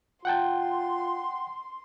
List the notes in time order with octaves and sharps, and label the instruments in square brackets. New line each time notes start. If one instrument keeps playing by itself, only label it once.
[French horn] F4 [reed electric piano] F#5 G5 A5 [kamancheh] C6